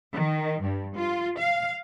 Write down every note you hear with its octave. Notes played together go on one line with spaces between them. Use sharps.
D#3
G2
F4
F5